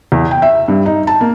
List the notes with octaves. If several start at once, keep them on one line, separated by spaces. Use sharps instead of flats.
E2
G5
E5
G2
D#4
A5
A#3